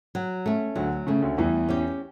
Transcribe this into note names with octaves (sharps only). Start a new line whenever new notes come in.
F#3
A3 C#4
D2 D3 F#3
C#3 A3 C#4
D2 D3
E2 E3 G3
C#4 G4